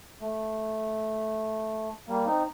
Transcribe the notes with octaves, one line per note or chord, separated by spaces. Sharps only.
A3
G3 A#3
C4 D#4